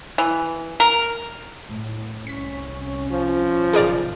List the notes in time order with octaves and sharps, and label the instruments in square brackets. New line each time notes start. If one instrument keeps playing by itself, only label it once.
[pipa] E3
A#4
[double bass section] A2
[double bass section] C2 C#4 [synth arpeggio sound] B6
[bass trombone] F3
[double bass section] F#1 B2 D#3 [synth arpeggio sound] G#4 A#4 D5